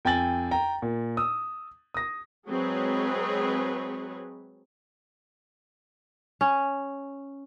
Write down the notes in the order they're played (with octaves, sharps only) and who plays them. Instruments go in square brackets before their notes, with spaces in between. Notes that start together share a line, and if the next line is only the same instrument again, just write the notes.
[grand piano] F2 G5 G#5 A6 F#7
G5 A#5
A#2
D#6 E6
D#6 A#6
[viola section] F#3 G#3 C4 G#4 B4 C#5
[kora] C#4